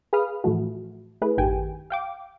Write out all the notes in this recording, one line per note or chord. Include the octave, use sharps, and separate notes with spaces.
G#4 B4 F5 B5 D#6 F6
A2 E3 F3 A3 F#4
A3 E4 G#4 B4
A1 F#2 D#3 G4 G5 G#5
F5 G5 D6